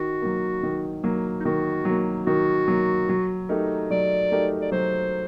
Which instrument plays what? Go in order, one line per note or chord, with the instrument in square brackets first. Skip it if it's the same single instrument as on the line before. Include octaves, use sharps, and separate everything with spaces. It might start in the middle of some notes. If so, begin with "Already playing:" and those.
Already playing: [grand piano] D#3 [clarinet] F#4
[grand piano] F#3 A#3
D#3
F#3 A#3
[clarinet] D#4
[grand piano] D#3 [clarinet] F#4
[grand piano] F#3 A#3
[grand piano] D#3 [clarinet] F#4
[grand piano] F#3 A#3
F#3
A3 D#4 G4 A#4
[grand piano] F#3 [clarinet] D5
[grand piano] A3 D#4 G4 A#4
[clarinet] D5
[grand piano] F#3 [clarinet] C5